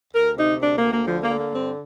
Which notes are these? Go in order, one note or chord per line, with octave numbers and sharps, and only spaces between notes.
D2 A#4
C3 D#4
D2 D4
A#3
D2
A#3
D3 F3
A#3
D3
A#3
G2 C4